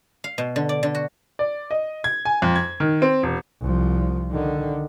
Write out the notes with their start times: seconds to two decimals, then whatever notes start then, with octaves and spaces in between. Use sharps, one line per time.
0.24 F5
0.38 B2
0.56 D3
0.69 D5
0.83 D3
0.95 F#4
1.39 D5
1.71 D#5
2.04 G#6
2.25 G#5
2.42 F2
2.56 G#6
2.80 D#3
3.02 C4
3.23 E1
3.61 C2 F3
4.31 D3 D#3